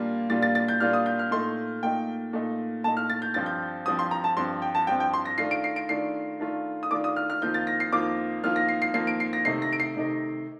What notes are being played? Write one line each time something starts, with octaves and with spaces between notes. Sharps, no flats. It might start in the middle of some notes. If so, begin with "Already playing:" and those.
Already playing: A#2 G3 A#3 D4 F4
A#2 G3 A#3 D4 F4 A6
A6
A6
G6
A#2 G3 A#3 D4 F4 F6
D#6
G6
F6
A#2 A3 D#4 C6
A#2 A3 D#4 G5
A#2 A3 D#4
A#2 A3 D#4 A5
F6
A6
G6
G2 F3 C4 A6
G6
G2 F3 C4 D#6
C6
A#5
A5
G2 F3 C4 C6
G5
A5
G2 F3 C4 G5
G5
C6
A#6
D#3 A3 D4 F4 C7
D7
C7
D7
D#3 A3 D4 F4 C7
D#3 A3 D4 F4
D#6
D#3 A3 D4 F4 D6
D#6
F6
F6
F2 D#3 A#3 F4 G6
A6
A#6
C7
F2 D#3 A#3 F4 D6
F2 D#3 A#3 F4 F6
A#6
C7
C7
F2 D#3 A#3 F4 C7
D7
C7
A#6
C3 D#3 A3 D#4 C7
A#6
D7
C7
C3 D#3 A3 D#4